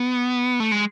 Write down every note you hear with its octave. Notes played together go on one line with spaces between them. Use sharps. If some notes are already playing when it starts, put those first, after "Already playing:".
Already playing: B3
A3
G#3